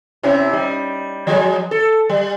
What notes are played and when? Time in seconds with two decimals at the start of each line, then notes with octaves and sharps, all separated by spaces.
0.23 C3 C#4 E4
0.53 G3 D#4
1.27 F3 F#3 G#3
1.71 A4
2.10 G3